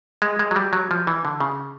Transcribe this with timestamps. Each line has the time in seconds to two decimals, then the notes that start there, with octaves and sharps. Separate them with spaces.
0.22 G#3
0.39 G#3
0.51 F#3
0.56 G3
0.73 F#3
0.91 F3
1.07 E3
1.25 D3
1.40 C#3